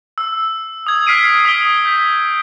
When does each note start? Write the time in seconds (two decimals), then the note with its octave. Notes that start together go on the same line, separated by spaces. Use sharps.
0.18 E6
0.87 D#6 G#6
1.07 F6 B6 C7 D7 D#7
1.45 D#6 B6 D7 G7
1.85 G6 B6